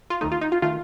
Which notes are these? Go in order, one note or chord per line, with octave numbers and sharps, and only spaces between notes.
F4
D#2 D#3 A3 D#4
F4
D#4
F4
D#3 A3 F4